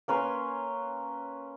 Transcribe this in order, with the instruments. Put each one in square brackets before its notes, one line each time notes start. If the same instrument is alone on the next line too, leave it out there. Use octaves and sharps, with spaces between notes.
[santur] A#3 C#4 B4 C6